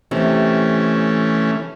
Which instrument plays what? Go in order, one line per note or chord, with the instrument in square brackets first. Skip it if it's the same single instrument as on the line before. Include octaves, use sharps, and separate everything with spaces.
[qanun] C3 [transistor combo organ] E3 A3 C#4